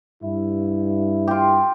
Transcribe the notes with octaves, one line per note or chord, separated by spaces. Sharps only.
G2 E4
F4 G4